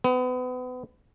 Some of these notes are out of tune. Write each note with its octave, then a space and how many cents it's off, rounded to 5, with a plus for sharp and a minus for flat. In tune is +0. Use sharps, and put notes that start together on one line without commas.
B3 +35